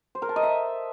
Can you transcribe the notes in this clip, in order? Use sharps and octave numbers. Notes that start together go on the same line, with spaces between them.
C5
A#4
A5
D#5
E5